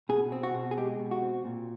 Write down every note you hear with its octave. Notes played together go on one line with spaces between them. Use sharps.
B2 G#4
C4
F#4
B2
G#4
G#3 G4
B2
F#4
C4
A#2